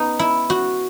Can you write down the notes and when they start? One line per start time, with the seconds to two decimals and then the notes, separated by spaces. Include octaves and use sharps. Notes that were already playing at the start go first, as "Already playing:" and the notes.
Already playing: B3 D#4
0.19 E4
0.50 F#4